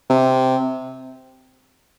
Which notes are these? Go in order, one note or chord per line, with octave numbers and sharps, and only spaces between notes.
C3